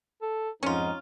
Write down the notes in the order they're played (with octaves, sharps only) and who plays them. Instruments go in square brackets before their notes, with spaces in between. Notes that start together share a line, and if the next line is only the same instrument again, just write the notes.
[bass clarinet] A4
[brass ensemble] F2 G#2 [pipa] C#4 F4 [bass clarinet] D#4